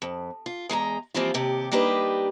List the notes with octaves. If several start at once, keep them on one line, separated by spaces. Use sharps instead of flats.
F2
F4
E2 G#3 G4 A#5
E3 F3 G3 A#3 C4 F4
D#2 C3 G4
G3 A#3 D4 D#4 G4 B4